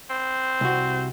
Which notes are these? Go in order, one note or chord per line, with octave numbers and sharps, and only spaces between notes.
C4
C2 F#4